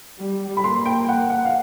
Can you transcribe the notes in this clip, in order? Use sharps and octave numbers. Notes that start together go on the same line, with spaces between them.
G3
B5
A#3 C6
G5
F#5
F#5
F5